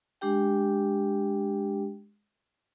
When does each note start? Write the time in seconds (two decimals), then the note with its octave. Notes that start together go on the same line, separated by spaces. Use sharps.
0.21 G#3 D4 G4 G5